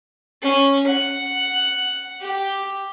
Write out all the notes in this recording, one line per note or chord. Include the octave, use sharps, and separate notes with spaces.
C#4
F#5
G4